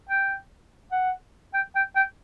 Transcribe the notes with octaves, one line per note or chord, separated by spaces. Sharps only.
G5
F#5
G5
G5
G5